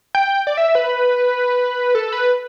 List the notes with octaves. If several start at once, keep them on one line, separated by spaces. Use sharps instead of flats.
G5
D5
E5
B4
A4
B4